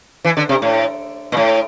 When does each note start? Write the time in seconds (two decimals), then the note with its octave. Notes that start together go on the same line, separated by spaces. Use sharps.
0.25 E3
0.37 D3
0.49 C3
0.62 A2
1.32 A#2
1.37 A2